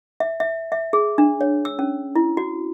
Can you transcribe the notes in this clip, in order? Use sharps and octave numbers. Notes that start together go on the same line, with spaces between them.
E5
E5
E5
G#4
D4
C#5
E6
C#4
E4
F#4